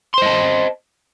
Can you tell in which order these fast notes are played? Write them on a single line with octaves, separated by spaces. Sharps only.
C6 C5 D#5 A5